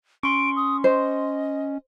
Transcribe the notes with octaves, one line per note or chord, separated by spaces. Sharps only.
C#4 C6 C#6 D7
D#6
C5 D#5